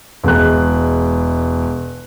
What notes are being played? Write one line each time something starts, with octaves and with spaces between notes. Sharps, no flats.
E1 G#3 F#6